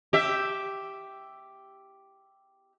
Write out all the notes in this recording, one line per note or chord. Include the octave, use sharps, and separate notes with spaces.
G4 E5